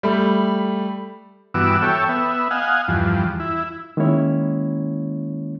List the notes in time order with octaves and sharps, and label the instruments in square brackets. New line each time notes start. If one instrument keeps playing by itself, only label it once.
[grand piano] G3 A3 B5
[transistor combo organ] G2 E3 B3 F#4 D6 E6
A4 C#5 E5 G5
B3 E5
D#5 F5 F#5 G#5
E2 G2 F3
E4
[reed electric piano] D#3 G#3 A#3 C#4 E4 C#5